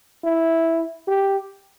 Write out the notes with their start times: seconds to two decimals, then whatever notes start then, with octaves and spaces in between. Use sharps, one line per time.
0.24 E4
1.08 G4